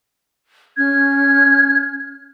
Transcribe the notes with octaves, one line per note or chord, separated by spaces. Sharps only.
C#4 F6 G#6